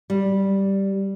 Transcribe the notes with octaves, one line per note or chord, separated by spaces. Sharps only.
G3